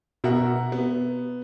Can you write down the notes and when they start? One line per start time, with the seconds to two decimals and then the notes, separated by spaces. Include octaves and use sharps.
0.24 B2 A#4 E5 F#5
0.72 B3